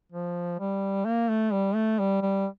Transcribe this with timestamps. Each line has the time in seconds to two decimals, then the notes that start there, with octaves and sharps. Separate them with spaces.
0.12 F3
0.59 G3
1.05 A#3
1.29 A3
1.52 G3
1.75 A3
1.99 G3
2.22 G3